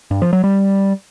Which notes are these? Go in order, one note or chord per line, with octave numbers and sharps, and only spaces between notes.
G2
F3
F#3
G3